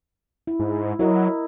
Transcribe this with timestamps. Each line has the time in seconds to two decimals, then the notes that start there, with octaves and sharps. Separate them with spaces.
0.47 E4
0.60 G#2
0.99 F#3 E4 A#4 D#5